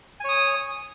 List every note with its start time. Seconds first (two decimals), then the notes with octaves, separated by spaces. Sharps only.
0.20 G#5
0.24 C#5
0.29 D#6